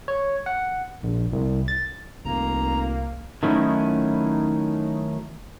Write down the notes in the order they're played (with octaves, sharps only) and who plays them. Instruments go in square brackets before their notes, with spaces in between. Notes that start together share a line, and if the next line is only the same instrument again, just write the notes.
[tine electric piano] C#5
F#5
A#1
C2
A6
[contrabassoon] F1 [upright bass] C2 [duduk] A#3 [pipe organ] A#5
[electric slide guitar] D#3 F#3 A3 C#4 D#4 E4